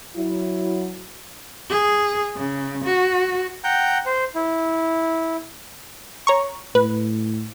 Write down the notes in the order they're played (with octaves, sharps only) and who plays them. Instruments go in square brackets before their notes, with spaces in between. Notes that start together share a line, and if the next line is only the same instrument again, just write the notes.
[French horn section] F#3 E4
[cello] G#4
C#3
F#4
[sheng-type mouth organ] F#5 G5 A#5 G6
C5
E4
[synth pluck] C#5 A#5 C#6
[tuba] A2 [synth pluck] B4